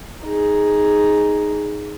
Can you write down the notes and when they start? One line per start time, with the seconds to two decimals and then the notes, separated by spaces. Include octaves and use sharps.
0.24 D#4 G#4